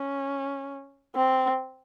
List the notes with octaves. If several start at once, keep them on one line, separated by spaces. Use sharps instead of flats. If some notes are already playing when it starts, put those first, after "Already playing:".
Already playing: C#4
C4